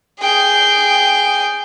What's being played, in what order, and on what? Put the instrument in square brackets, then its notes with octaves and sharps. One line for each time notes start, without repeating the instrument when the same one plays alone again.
[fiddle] G#4 G5